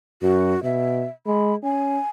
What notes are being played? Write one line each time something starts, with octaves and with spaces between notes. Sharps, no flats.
F#2 F#4
B2 E5
G#3 B5
C#4 G#5